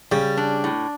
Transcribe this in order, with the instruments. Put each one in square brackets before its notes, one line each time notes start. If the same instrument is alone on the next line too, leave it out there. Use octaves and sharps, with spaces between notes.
[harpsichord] C#3 [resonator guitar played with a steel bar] G3
[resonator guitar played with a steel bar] D4
A2